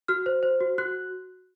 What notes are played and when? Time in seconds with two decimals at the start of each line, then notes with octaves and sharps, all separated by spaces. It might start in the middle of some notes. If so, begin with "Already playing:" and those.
0.08 F#4 F6
0.26 C5
0.43 C5
0.61 F#4
0.78 F#4 F#6